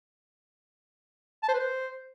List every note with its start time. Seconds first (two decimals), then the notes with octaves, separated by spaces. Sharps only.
1.43 A5
1.48 C5
1.54 B4
1.59 C5